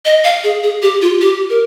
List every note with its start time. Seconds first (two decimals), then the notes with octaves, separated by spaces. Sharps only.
0.05 D#5
0.24 F5
0.44 G#4
0.63 G#4
0.82 G4
1.02 F4
1.21 G4
1.50 A#4